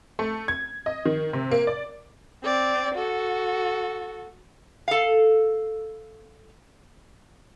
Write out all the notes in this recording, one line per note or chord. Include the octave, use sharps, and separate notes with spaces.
A3
G#6
D#5
D#3
C3
A#3
D5
C4 D5
F#4 A4
A4 F5